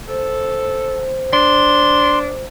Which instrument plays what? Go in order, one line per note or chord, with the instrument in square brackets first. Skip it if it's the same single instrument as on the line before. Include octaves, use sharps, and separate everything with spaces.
[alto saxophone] A4 [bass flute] C5
[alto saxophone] D4 [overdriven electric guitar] C6